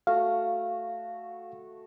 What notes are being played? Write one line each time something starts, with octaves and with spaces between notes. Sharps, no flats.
A3 F#4 F5